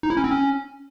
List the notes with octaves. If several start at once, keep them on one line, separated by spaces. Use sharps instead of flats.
D#4
E4
C#4
C4
C#4